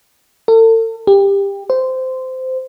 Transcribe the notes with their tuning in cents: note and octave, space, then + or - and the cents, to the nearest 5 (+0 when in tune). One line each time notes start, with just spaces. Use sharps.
A4 +40
G4 +20
C5 -15